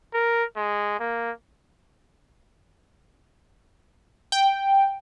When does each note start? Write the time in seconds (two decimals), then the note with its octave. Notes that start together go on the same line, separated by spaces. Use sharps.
0.14 A#4
0.56 G#3
1.00 A#3
4.32 G5